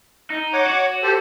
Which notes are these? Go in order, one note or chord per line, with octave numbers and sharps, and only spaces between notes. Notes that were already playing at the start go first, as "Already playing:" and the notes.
D#4
C#5 F#5 D6
F#4
G4 A4 C5